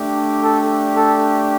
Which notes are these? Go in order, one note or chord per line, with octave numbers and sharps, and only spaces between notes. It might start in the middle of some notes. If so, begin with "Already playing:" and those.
Already playing: A3 D4 G4
A4
A4